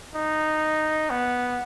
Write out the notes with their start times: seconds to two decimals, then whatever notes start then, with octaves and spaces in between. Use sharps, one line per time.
0.15 D#4
1.10 B3